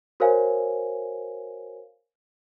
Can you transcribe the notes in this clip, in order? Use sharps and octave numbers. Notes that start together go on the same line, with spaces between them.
F#4 A#4 C5 C#5 F5 G#5